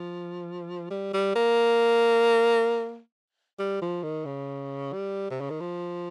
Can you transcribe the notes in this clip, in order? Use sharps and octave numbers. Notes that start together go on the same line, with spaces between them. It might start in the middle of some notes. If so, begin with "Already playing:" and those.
Already playing: F3
G3
G3
A#3
G3
F3
D#3
C#3
G3
C3
C#3
D#3
F3